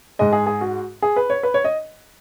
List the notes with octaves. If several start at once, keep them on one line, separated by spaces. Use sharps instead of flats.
G#2 G#3 D#5
G#4
G#4
F#4
G#4
B4
C#5
B4
C#5
D#5